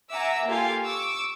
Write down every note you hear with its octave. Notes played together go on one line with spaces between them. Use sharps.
E5 F#5 G#5 A#5 D6 E6
A#3 F4 G4 A4 F5 G#5
C#6 D6 E6